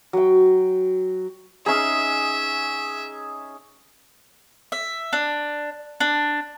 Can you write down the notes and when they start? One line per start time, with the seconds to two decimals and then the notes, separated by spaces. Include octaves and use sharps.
0.13 F#3 G5
1.66 C#4 D#4 G#4 E5
4.72 E5
5.13 D4
6.00 D4